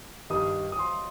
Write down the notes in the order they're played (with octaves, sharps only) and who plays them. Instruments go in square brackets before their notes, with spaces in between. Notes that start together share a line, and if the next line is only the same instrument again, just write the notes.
[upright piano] G2 D#3 G3 [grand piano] D#6
[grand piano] D#6
C6